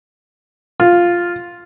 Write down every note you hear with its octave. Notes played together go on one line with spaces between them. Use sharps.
F4